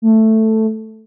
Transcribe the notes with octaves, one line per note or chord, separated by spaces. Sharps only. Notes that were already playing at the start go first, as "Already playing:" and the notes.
A3